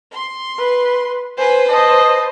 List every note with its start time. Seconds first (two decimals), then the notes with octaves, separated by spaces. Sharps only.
0.12 C6
0.58 B4
1.38 B4 C5 G#5
1.69 C5 D#5 A5